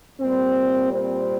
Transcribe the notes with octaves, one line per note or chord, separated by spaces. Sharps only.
A#2 G3 C4
C4